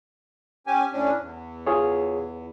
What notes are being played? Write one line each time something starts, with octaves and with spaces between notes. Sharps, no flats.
C#4 G4 G#5
A2 C#4 D4
E2
F4 G#4 C#5